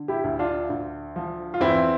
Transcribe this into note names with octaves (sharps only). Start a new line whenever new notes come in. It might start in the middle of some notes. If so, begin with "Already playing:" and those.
Already playing: D3
E4 G4
D2
D4 F4
D2
F3
F4
E2 C4 E4